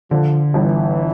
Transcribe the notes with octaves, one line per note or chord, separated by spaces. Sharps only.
D3 F3
G1 E3